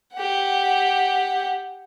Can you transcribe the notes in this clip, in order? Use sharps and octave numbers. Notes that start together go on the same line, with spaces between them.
G4 F#5